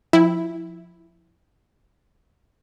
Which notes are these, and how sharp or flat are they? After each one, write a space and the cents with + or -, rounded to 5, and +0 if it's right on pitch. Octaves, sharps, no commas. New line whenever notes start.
F3 +10 E4 +0 G5 +0